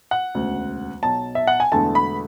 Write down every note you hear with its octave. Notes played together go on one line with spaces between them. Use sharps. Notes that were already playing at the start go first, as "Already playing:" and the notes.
F#5
E1 D2 C#3
B1 B2 F#3 A5
E5
F#5
G#5
E1 E2 D3 A3 A5
B5